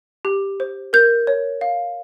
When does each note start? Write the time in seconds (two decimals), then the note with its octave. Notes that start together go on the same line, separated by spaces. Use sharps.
0.25 G4
0.60 C5
0.93 A#4 G6
1.27 C#5
1.61 F5